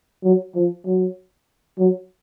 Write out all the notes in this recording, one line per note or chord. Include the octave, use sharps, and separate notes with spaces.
F#3
F3
F#3
F#3